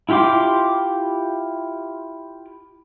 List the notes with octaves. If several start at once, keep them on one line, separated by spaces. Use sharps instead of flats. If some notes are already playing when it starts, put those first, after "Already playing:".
E4 F4 G4 C6 D6